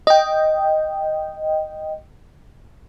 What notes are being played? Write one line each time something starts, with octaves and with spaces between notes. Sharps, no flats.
D#5 G5